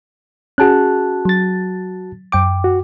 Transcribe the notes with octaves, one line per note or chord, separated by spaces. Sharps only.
C#4 F#4 G#4 A5 F#6
F#3 A6
F#2 G5 D6
F#4